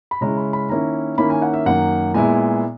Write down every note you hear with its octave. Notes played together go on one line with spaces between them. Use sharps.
B5
C#3 G#3 C#4 E4 A#5
B5
B5
D#3 A#3 C#4 E4 A#5
D#3 A#3 C#4 E4 B5
G#5
F#5
E5
F#2 D#3 A#3 F#5
A#2 G#3 B3 E4 G#5